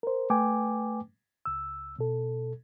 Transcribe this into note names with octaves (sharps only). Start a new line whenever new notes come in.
A#4 C5
A3 B4 G5 G#5 D6
C#2 E6
B2 A4